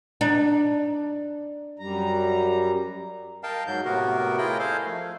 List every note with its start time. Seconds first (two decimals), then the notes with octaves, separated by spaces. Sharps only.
0.21 D4 D#4
1.79 F#2 G3 A#5
3.43 A#4 D#5 F5 G5 A5
3.67 G#2 F#3 G6
3.85 A2 C3 B3 F#4 A#4
4.38 E4 F4 G#4 A#4 D#5 G5
4.59 A4 C5 D#5 F5 G#5
4.86 F3 A3